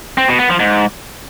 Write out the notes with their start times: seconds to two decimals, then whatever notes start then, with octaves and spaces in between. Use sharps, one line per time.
0.18 C4
0.28 B2
0.39 B3
0.49 F3
0.60 G#2